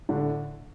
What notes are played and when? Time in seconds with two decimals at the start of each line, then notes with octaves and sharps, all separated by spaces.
0.09 A2 D3 D4